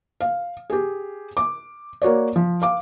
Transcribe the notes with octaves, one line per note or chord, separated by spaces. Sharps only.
F5
G4 G#4
D6
A#3 F#4 C#5 D5
F3
F5 D6